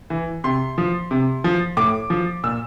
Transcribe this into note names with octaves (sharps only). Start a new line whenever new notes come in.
E3
C3 C6
F3
C3
F3
A2 D6
F3
A#2 E6